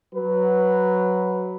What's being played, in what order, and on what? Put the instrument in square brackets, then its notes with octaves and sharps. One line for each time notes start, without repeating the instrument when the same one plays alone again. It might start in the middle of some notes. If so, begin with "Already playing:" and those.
[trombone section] F#3 B4